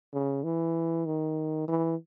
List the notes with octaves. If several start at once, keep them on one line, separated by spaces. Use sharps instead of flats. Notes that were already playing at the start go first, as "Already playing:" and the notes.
C#3
E3
D#3
E3